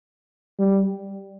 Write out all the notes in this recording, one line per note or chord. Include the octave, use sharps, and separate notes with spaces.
G3